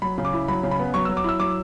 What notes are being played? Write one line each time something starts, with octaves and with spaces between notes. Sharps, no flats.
F#3 B5
C#3
D6
E4
F#3 B5
C#3
B5
B3
F#3 C#6
E6
F#3
D6
E4 E6
F#3 D6